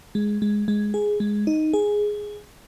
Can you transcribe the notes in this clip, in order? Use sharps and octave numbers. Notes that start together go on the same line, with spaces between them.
G#3
G#3
G#3
G#4
G#3
D#4
G#4